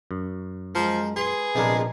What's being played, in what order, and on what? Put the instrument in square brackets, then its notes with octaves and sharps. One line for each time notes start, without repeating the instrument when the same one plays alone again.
[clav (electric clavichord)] F#2
[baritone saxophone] F3 [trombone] G#3 [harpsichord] A#4 G5
[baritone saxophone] G#4 [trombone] B4 [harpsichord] C6
[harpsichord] A#1 G#3 B3 [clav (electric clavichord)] C3 D4 A#4